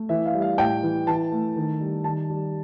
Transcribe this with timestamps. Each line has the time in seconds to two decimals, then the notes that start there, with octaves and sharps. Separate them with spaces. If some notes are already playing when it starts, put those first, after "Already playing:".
Already playing: A3
0.09 E3 E5
0.26 F5
0.34 G3
0.42 F5
0.58 A2 G5
0.83 E3
1.07 E3 A5
1.32 A3
1.56 D#3
1.80 G3
2.04 D#3 A5
2.30 G3